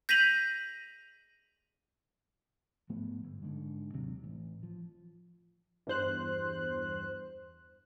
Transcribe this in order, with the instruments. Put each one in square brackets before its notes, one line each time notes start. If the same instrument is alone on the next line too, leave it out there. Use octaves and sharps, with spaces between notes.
[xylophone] G6 A#6 B6 D#7 F7 F#7
[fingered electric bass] G#2 F3 A3 B3
G1
G#2 D3
D#2 C3 F#3
A1
F3
[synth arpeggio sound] E2 G2 C5 F#6